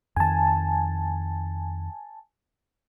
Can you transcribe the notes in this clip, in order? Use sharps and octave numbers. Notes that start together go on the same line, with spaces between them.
F2 D#3 G#5 A5